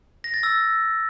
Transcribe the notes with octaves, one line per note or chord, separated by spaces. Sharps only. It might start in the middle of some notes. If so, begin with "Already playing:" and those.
A#6
A6
E6